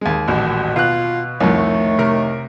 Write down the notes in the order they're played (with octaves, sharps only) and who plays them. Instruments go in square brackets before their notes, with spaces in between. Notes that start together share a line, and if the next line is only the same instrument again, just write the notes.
[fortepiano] D#2 G#3
[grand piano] D#1 A1 [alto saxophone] F#4
[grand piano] B2 F#6 [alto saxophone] F4
[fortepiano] C2 F2 [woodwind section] D#3 A3 [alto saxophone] C#5
[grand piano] C3 A#4